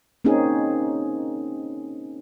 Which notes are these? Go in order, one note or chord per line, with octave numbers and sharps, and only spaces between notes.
A#3 C4 C#4 D#4 G#4